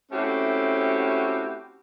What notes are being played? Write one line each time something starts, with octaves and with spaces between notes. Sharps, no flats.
A3 C4 C#4 E4 F#4 G4